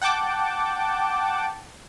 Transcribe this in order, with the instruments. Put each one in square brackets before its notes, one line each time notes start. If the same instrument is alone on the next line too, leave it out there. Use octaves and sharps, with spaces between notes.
[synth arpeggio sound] F#5 G5 A5 D6